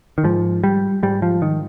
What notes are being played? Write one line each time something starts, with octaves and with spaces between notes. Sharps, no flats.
D#3
G#2 F3
G3
G#2 G3
F3
D#3